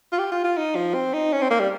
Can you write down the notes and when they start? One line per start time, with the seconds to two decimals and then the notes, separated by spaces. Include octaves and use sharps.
0.12 F4
0.18 G4
0.32 F4
0.44 F4
0.57 D#4
0.75 F3
0.94 C4
1.14 D#4
1.32 C#4
1.41 C4
1.50 A#3
1.60 G3